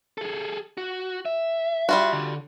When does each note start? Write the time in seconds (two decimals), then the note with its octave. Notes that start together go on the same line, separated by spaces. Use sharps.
0.18 G#4 A4
0.77 F#4
1.25 E5
1.89 G3 F4 F#4
2.13 D3